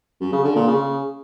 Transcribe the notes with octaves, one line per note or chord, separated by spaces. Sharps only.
F#2
C#3
D3
A#2
C#3